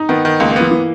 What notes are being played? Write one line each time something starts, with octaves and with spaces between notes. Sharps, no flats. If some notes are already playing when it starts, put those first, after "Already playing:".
Already playing: D#4
D#3 B3
D#3
C#2 A#3
A#3
E3 B3
E3